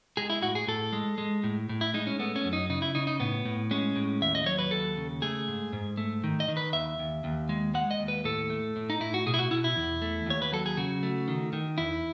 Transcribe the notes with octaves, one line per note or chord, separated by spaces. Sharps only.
G#3 G#4
E4
A2 F#4
G#4
A2 A4
G#3
G#3
A2
A2
E4
G#3 D#4
C#4
A3 B3
C#4
F#2
D#4
C#3 D#4
E4
C#3 D#4
D#4
A2 B3
A2
G#3 C#4
A2
D#2 E5
D#5
F#3 C#5
B4
D#2 A4
C#3
A3 G#4
G#2
G#2
A3
D#3
D#5
D#3
B4
D#2 E5
D#2
D#2
G#3
G#3 F#5
D#5
D#2
B4
A2 A4
A3
A2
D#4
A2 E4
F#4
B2 G#4
E4
F#4
B2 E4
E4
E2
A3
D#2 C#5
B4
F#3 A4
G#4
C#3 F#4
A3
D#3
D#3
E2 E4